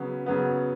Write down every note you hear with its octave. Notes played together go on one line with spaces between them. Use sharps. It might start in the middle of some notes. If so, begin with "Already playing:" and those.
Already playing: C#3 F#3 B3
C#3 F#3 B3